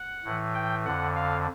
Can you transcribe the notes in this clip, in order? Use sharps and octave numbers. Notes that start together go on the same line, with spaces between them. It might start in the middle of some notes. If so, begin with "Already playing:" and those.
Already playing: F#5
A2 E3
G5
F2 D3 F#5
F5